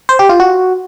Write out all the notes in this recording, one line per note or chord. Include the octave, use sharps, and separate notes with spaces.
C5
G4
F4
F#4